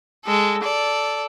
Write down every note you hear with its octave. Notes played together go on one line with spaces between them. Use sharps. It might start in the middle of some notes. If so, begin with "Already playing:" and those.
G#3 A4
A4 D5